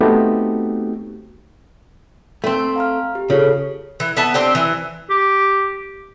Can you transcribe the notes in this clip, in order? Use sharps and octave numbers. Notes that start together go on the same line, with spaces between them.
A3 B3 C4 D#4 F#4 G4
A3 C4
F5 A#5 F6
G4
C#3 F4 G#4 A4
E3
B3 E5 A5
C4 D4 G4
E3
G4